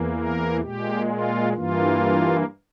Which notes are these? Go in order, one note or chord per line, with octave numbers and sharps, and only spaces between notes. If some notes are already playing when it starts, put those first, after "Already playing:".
Already playing: E2 E3 A#3
A#4
A#2 G#3 G4
F4
G2 E3 A#3 F4